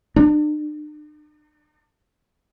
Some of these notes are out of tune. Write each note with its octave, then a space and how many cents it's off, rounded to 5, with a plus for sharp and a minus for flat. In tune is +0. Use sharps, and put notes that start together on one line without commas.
D4 +45